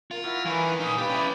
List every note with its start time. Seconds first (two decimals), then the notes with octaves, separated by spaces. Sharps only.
0.11 F4 A#4
0.23 F#3 E4 F#4 F6
0.45 D#3 E3 A#3 C#4 B4
0.80 A#2 D#4 D#6
0.98 G4 B4 D5 F5 G5
1.10 C#4 E4